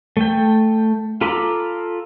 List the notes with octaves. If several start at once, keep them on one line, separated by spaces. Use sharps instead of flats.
A3 G5
F4 A4 A#5 B5 D6